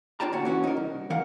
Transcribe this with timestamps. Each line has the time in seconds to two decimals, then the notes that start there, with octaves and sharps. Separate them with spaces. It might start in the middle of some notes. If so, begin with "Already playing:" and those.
0.20 D4 F4 C#5 G5 A5 A#5
0.32 D2 A#2 F#4
0.45 E3 C#4 F#4
0.64 D#4 A#4
0.77 C2
1.10 D#3 E3 A#4 F5 F#5